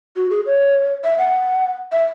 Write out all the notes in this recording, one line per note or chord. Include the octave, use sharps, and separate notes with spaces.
F#4
G#4
C#5
E5
F#5
E5